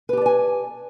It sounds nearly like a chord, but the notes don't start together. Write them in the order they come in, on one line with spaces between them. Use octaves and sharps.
B4 G4 A5 D5 G#5